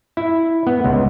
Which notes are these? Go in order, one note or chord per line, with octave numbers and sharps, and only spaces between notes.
E4
B3
C#2